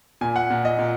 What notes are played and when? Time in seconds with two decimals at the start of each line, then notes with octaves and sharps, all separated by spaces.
0.21 A#2 G#5
0.36 F#5
0.50 A#2
0.65 D#5
0.79 A#2